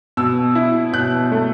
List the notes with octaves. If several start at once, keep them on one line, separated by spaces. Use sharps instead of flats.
B2 E6
E4
B2 F#6
A3